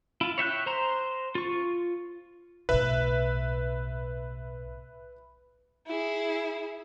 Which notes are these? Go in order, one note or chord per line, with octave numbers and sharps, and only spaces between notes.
E4 F4
C#5 E5 G5 F#6
C5 A#5 C6
F4 C#6
B1 A2 B4 E5
E4 G#4